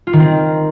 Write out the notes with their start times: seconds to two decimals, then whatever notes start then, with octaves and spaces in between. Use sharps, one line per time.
0.07 F4
0.13 D#3
0.20 C4